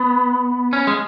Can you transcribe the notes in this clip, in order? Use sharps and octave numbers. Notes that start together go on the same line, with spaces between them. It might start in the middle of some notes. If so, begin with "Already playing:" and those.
Already playing: B3
C#4
G#3